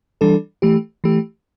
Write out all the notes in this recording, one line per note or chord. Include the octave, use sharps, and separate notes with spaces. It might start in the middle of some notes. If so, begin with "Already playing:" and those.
E3 G3 D4 A4
E3 A3 G4
E3 A3 G4